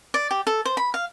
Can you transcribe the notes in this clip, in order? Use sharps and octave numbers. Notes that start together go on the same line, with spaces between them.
D5
G4
A4
C5
B5
F5